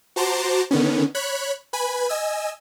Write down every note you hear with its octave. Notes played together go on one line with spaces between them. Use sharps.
F#4 C5 A5 A#5 C6 D6
D3 D#3 B3 C#4
C#5 B5 F#6
B4 G#5 B5
D#5 G#5 E6